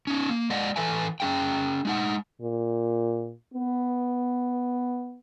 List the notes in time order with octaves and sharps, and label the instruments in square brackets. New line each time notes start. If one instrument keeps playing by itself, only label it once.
[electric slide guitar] C#4 D#4
A#3
G#3 D5 D#5 F#5
E3 A4 B4 E5 G#5
C#4 D4 G#4 F5 G5
G#3 D#4 F#5
[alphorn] A#2
B3